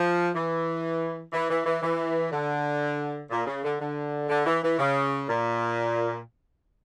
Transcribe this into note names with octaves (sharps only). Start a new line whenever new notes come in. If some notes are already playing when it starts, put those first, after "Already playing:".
Already playing: F3
E3
E3
E3
E3
E3
D3
A#2
C#3
D3
D3
D3
E3
E3
C#3
A#2